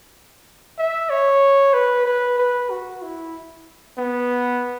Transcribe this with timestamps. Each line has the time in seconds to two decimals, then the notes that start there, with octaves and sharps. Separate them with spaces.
0.78 E5
1.10 C#5
1.74 B4
2.05 B4
2.38 B4
2.70 F#4
3.02 E4
3.98 B3